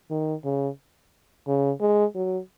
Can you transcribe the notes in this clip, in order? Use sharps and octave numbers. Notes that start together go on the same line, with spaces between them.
D#3
C#3
C#3
G#3
F#3